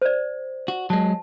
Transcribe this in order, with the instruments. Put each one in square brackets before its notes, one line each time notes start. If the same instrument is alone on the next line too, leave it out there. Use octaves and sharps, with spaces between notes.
[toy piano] C5 D5
[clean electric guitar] F#4
[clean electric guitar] F#3 G#3 [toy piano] A5